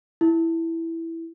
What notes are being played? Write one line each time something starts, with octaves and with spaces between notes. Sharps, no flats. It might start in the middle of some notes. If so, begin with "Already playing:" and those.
E4